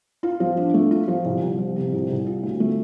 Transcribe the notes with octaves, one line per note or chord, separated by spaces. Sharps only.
F4
F3
D4
A3
F4
F3
C2
C2
F3
C3
C2
C2
F4
D2
A3